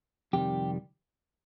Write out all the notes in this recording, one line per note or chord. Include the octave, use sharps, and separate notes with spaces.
F2 C3 D#3 G3 G4